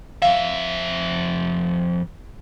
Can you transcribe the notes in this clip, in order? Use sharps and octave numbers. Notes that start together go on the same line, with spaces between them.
F2 E5 F5